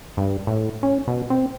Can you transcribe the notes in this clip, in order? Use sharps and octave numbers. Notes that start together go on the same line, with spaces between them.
G2
A2
C#4
B2
C4